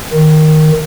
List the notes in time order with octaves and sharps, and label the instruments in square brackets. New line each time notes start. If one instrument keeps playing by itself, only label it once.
[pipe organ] D#3